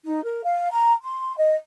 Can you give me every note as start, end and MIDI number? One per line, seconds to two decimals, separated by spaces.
0.06 0.23 63
0.24 0.41 70
0.44 0.71 77
0.71 0.92 82
1.02 1.36 84
1.37 1.56 75